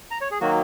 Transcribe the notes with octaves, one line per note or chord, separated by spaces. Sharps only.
A#5
C#5
G#4
D#3 F#3 A#3 F#4